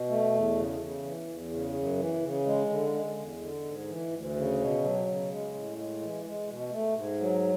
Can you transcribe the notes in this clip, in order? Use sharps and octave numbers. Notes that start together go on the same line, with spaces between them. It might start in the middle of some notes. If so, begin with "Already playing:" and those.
Already playing: B2
A3
E2
C#3
C#3
E3
E2
C#3
F#2
E3
C#3
G#3
D3
G#3
E2
D3
G#2
E3
D2
C#3
B2
F#3
C#3
G#3
A2
G#3
E3
G#3
B2
A3
G#2
F#3